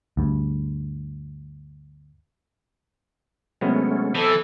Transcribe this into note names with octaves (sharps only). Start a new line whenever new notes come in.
D2 G2
C3 F#3 G#3 A3 B3 C#4
E3 A4 C5 D#5 G#5